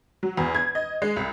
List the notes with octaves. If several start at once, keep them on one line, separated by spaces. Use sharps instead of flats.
F#3
E2
G#6
D#5
G#3
C2